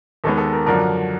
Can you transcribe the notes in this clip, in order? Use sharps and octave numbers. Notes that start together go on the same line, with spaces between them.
D#2 D#3 G#3 B3 A4
A4
A#4
F#2 D3 F3 A#4